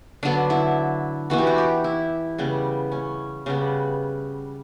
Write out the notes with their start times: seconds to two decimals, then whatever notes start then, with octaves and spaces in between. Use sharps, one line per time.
0.23 D3 F#3 B3 D4
0.50 E4
1.30 E3 B3 F#4
1.38 G4
1.47 F#4
1.58 G4
1.84 E4
2.38 C#3 G3 B3
2.92 C#4
3.46 C#3 G3 B3